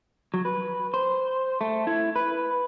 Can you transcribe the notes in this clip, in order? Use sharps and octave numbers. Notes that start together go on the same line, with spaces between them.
F#3
B4
C5
A3
E4
B4